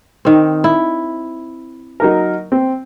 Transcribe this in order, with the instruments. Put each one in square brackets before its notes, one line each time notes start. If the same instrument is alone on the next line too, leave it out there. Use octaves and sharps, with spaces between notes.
[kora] D#3 C4
E4
[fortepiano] F#3 D#4 A#4
C4